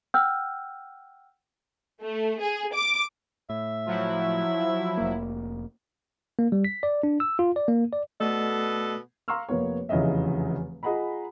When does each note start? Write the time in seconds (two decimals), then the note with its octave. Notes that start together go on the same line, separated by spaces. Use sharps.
0.14 F#5 G5 E6 F6 G6
2.01 A3
2.40 G#4
2.73 D6
3.50 A2 E5
3.86 F3 F#3 E4
4.97 F1 A#3
6.39 A#3
6.52 G3
6.64 B6
6.83 D5
7.03 D4
7.20 E6
7.39 F4
7.56 D5
7.68 A#3
7.93 D5
8.20 B2 A3 B3 A4 D5 D#5
9.28 F5 A#5 C6 C#6 E6 F6
9.49 F1 A#3 B3 C#5
9.89 F1 E2 C#3 C#5 D#5 E5
10.83 F4 G#4 D#5 F#5 A#5 B5